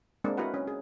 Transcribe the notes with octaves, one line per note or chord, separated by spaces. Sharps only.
G#3 A#3 C4 D4 A#4
E4 F#4 A#4 B4 F#5
C#4
G#4